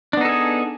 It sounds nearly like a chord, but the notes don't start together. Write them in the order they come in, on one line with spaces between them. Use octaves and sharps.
D4 B3 D#4 A4 G#4